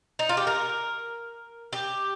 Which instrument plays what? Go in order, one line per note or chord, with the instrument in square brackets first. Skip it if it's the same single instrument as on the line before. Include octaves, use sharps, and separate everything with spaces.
[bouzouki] D#4
F4
G4
A#4
G4